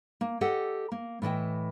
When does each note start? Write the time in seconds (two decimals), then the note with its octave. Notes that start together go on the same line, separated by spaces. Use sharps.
0.21 A#3
0.41 G4 A4 D#5 F#5
0.92 A#3
1.22 A2 E3 D#5 G5